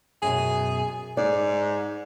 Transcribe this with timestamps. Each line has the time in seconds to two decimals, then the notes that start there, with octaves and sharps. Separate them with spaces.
0.22 F#2 B2 G#4
1.17 G#2 D5